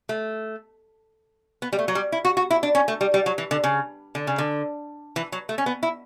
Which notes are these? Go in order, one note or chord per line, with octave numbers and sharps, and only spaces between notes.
A3
B3
G3
A3
F#3
G3
E4
F#4
F#4
E4
D4
C#4
A3
G3
G3
F#3
E3
D3
C#3
D3
C#3
D3
E3
F#3
A3
C#4
B3
E4